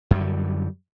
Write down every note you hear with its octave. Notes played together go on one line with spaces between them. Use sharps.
F#2 D3 G3